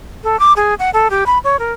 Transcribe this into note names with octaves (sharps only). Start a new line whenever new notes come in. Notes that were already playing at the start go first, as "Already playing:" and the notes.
A4
D6
G#4
F#5
A4
G4
B5
C#5
A#4